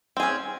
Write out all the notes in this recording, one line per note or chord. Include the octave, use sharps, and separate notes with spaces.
C4 C#4 G#4